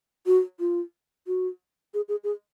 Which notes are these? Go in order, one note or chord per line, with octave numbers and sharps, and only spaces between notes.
F#4
F4
F#4
G#4
G#4
G#4